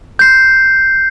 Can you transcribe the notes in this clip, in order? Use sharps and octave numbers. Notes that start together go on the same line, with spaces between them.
G6 C7